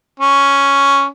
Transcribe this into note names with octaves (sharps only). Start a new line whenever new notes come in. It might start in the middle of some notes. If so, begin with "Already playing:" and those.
C#4